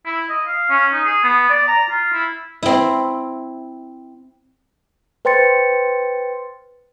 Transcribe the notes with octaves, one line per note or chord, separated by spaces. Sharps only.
E4
D#5
F5
C#4
D#4
G#4
B3
D5
A#5
F4
E4
C4 E4
B4 C5 G5 C6 A6 C#7